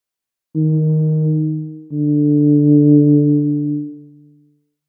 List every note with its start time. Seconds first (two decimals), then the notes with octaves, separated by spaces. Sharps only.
0.56 D#3
1.92 D3